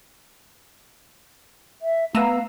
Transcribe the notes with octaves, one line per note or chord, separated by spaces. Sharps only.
E5
A3 B3 F5 A#5 E6 D#7 E7